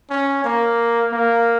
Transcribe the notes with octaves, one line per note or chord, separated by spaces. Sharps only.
C#4
A#3
A#3